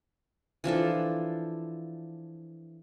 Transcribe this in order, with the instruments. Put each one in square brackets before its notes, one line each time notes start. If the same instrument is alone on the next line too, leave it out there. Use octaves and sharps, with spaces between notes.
[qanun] E3 F3 D4 A4